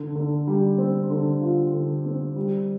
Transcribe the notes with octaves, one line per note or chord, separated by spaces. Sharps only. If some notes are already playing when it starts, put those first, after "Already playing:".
Already playing: D3
D3
G3
C4
D3
F4
D3
C4
G3